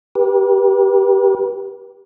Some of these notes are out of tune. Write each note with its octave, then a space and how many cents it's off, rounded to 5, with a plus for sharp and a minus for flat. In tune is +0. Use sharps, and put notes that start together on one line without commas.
G4 +0 B4 -40